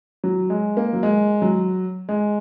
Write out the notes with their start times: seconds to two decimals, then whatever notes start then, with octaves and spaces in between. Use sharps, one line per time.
0.24 F#3
0.50 G#3
0.77 A#3
0.93 F#3
1.03 G#3
1.42 F#3
2.09 G#3